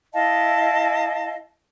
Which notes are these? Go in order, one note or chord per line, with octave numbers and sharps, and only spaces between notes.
E4 D#5 F5 A5